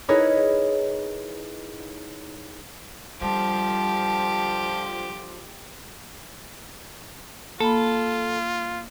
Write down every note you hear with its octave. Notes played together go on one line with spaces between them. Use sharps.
D#4 E4 G#4 A#4 B4 C#5
D3 F3 G3 G4 A5
A#3 F4 A4 B5